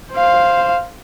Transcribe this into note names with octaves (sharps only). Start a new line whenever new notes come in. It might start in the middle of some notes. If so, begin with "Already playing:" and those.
C5 F5